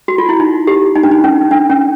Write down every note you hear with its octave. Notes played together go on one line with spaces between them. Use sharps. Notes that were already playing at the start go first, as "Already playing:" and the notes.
F#4
F4
E4
D#4
G4
D#4
D4
D#4
C#4
D4
C#4